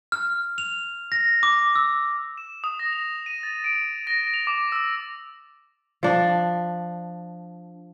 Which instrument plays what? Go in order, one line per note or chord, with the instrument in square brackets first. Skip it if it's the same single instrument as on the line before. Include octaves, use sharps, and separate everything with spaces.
[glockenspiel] F6
F7
A#6
D6
E6
[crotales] E7
D#6
A#6
F7
D#7
A6
D7
A#6
F7
D6
E6
[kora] F3 D4